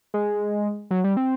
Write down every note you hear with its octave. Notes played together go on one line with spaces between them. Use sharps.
G#3
F#3
G3
C4